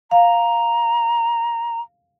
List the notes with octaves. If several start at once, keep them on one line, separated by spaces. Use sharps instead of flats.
F5 A#5